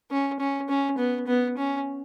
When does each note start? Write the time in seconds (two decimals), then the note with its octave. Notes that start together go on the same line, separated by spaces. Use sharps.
0.11 C#4
0.40 C#4
0.69 C#4
0.98 B3
1.27 B3
1.57 C#4